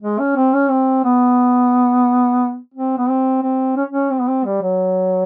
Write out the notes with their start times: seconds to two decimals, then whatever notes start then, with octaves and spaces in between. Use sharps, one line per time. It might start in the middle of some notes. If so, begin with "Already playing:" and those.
0.02 G#3
0.19 C#4
0.36 C4
0.54 C#4
0.70 C4
1.05 B3
2.74 C4
2.98 B3
3.09 C4
3.43 C4
3.76 C#4
3.90 C#4
4.11 C4
4.20 B3
4.28 C4
4.45 G3
4.62 F#3